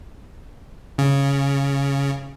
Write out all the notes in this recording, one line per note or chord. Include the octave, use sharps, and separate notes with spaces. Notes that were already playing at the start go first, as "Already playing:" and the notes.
C#3